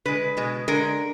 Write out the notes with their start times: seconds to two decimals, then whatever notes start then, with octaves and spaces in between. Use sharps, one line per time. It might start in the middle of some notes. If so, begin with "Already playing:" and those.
0.05 D3 G#3 B4
0.37 B2 G#3
0.68 D3 G#3 A#4